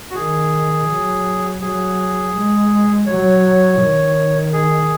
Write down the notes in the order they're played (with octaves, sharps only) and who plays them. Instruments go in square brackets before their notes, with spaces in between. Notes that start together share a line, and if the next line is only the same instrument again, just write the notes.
[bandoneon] F#4
[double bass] D#3 [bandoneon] G#4
[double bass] F#3
[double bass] F#3 [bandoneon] G#4
[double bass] G#3
[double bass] F#3 [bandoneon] C#5
[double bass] D#3
[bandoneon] G#4